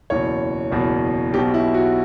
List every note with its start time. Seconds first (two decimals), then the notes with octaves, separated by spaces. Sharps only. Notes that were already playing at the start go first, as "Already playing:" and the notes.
0.10 F#1 E2 B2 C#5
0.71 F#1 E2 B2
1.33 B1 G4
1.37 B2
1.54 E4
1.74 F#4